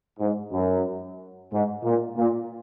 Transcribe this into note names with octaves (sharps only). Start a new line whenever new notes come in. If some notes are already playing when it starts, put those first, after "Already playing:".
G#2
F#2
G#2
A#2
A#2